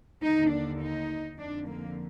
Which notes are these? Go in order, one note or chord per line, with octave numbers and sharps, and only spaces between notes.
D#2 D3 D#4
D4
D#4
F2 D3 D4
A#3